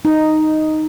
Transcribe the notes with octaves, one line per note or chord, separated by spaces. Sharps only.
D#4